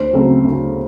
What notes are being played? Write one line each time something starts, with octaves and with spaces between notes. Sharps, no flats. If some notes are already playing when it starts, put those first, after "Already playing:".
Already playing: D2 C5
C#3 F#3 A3 C4
D2